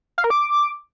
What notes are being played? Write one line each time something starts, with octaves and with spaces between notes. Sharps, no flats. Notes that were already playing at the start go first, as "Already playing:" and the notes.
F5
A#4
D6